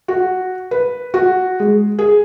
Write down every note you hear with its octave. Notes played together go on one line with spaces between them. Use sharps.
F#4
B4
F#4
G#3
G#4